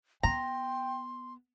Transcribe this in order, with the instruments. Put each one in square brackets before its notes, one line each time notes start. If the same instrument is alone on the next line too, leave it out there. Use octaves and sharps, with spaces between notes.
[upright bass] B3 [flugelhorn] G5 [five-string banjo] A#5 [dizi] C6